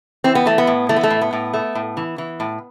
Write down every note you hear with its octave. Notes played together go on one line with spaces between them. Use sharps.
E3 C4
B3
E3 A3
B3
A2
E3 A3
B3
A3
A2
B3
A2
A3
A2
E3
E3
A2